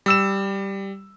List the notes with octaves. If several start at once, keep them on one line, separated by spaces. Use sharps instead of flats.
G3 E6 E7